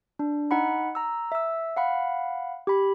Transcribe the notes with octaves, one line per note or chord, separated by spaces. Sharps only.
D4
D#4 F#5 B5
A#5 E6
E5 E6
F5 F#5 B5
G4 B5